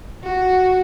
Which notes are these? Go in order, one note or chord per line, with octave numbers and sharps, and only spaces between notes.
F#4